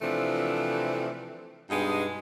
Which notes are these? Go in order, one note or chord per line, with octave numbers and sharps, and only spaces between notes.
C3 E3 F3 A3 C4 D4
G2 B2 G3 G#3 B3 D#4